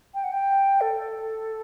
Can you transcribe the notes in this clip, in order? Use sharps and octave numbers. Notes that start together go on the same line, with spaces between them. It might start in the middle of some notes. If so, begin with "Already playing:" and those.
G5
F#5
G5
A4